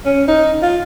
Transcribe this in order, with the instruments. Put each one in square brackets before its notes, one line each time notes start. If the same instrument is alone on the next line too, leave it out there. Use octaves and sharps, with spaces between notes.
[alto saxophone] C#4
D#4
F4